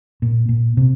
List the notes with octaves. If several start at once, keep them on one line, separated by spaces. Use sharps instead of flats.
A#2
A#2
C3